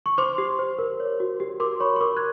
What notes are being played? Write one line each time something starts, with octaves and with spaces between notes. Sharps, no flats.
C#6
C5 C6 D6
G4
C5
A#4
C#5
F#4
G4
A#4 C6 D6
C#5 B5 C#6
C#6
A#4 C6 D6
F#6 G#6